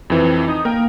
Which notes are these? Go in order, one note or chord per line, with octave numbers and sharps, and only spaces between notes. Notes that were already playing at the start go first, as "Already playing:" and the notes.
F2 E3 C4
D#4 D#6
A#3 A#4 G5